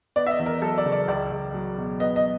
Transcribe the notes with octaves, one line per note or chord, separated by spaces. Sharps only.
B3 D5
E5
D#5
E2
A#4
F#3 A4
D5
C#3
D5
C#2 D5
C#2
F#3
B2
B3 D#5
D#5